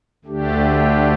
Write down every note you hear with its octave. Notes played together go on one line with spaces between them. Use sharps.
D2 D3 A3 D4 G4